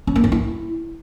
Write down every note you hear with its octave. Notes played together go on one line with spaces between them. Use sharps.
C#4
A#3
C#4
E4